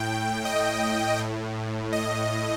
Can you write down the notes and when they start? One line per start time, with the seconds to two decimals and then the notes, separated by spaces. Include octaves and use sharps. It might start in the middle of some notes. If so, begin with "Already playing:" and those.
Already playing: A2 G5
0.45 D#5
1.19 A2
1.93 D#5